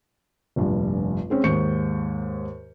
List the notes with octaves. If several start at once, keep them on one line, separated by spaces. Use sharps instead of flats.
F1 A#1 G2
G#3 C4 C#4
D#2 G#2 C#6 G6 C#7